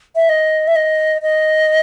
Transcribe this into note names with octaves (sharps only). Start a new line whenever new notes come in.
E5
D#5
E5
D#5
D#5